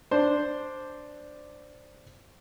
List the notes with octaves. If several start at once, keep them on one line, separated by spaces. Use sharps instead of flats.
D4 C5